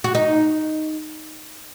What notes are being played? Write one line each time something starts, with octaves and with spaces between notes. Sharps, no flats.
F#4
D#4